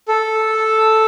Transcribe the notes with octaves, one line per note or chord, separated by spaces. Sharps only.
A4